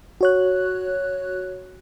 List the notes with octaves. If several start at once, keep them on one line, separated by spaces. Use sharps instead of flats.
F#4 C#5 F#6